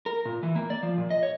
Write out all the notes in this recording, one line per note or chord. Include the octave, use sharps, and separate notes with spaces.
A#4
A#2
E3
A#3
D5
F3
A#2
D#5
C#5